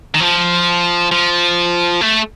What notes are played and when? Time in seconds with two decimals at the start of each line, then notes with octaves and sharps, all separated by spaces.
0.15 D#3
0.20 F3
1.11 F3
2.01 A3